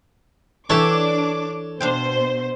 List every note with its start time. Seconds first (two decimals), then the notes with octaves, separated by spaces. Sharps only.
0.70 E3 D4 A4 C#5 E5 G5 D6
1.80 B2 D4 C5 F5 G5